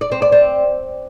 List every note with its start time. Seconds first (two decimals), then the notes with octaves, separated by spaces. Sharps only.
0.01 D5
0.12 C4
0.22 D5
0.32 C4